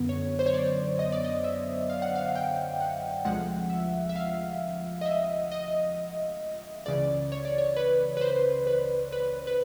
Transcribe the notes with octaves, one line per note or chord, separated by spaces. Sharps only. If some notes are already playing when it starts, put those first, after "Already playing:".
Already playing: F#2 D3 F#3 B3
C#5
C5
C#5
D5
D#5
D5
D#5
E5
F5
F#5
F5
G5
F#5
D2 C3 F3 G#3 F#5
E5
E5
F5
D#5
E5
D#5
C#2 C#3 E3 D5
C#5
D5
C#5
B4
B4
C5
B4
B4
B4